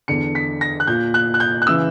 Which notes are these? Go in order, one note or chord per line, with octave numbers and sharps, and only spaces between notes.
E2 D3 C#7
B6
A#6
F#6
A#2 G6
F#6
F#6
G6
F#6
C#3 E3 E6